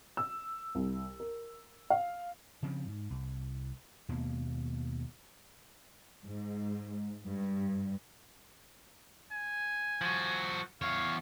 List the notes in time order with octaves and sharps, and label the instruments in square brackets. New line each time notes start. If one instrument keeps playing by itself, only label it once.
[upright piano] E6
C2
A#4
F5
[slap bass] C#3 F3 C4
G#2
C2
D#2 B2 G#3 A#3
[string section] G#2
G2
[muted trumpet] G#5
[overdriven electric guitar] F3 F#4
[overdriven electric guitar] E2 C#5 [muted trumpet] F5